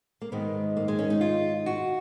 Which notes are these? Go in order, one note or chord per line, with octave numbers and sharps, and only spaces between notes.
A#3
G#2 D#3 G#3 B3
A#3
G#3
C#4
D#4
F4
F#4